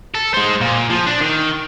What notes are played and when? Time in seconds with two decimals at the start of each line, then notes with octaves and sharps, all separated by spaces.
0.15 A4
0.34 G#3 C5
0.61 A#2
0.90 F3
1.06 D4
1.21 D#3